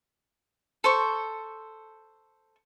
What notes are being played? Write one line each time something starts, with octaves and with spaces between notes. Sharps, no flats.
A4 C5 C#6